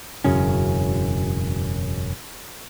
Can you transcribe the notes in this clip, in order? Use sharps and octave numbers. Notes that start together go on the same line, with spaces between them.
E1 F#2 C#3 C#4